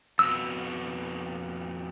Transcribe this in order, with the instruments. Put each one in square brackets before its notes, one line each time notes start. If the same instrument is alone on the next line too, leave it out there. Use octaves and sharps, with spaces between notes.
[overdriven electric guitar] F2 B2 [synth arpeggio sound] E6